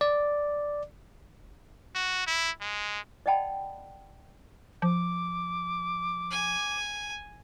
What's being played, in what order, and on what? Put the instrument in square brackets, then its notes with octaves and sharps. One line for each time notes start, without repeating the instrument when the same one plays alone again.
[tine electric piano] D5
[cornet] F#4
E4
G#3
[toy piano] D5 D#5 F#5 G5 A5 B5
[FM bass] F3 [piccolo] D6
[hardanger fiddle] G#5